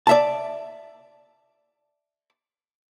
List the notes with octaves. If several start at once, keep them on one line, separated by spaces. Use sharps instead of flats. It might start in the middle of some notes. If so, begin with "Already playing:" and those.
D5 E5 A5